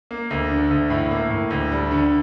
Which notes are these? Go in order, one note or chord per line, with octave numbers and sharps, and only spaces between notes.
A#3
D2
D3
D2
A2 E4
A#3
A2
D2
G3
D3